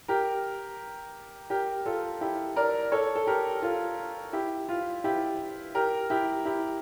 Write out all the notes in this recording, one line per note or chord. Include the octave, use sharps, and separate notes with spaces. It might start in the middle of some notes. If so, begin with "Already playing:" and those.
G4 A#4
G4 A#4
F4 A4
E4 G4
A#4 D5
A4 C#5
A4
G4 A#4
F4 A4
E4 G4
F4
E4 G4
G4 A#4
E4 G4
E4 G4